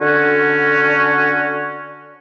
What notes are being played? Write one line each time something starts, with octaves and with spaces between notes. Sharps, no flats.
D3 C#4 F#4